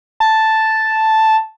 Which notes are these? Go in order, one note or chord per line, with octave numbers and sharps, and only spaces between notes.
A5